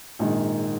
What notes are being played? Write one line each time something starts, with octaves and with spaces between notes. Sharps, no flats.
A#1 G#2 D#3